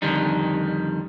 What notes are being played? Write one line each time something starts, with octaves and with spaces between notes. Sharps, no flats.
F2 D3 D#3 G3 D#4